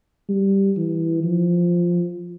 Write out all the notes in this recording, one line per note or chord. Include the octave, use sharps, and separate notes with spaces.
G3
E3
F3